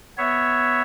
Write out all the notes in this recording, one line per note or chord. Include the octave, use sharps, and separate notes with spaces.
B3 C#5 E5